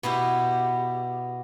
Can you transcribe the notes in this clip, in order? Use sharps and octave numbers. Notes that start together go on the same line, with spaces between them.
B2 B3 E4 G4